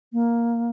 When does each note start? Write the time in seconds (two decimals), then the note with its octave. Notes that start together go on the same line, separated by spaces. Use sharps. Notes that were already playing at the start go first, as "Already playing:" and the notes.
0.13 A#3